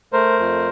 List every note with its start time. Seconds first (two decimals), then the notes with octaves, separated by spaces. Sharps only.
0.13 A3 A#4 C5
0.39 F2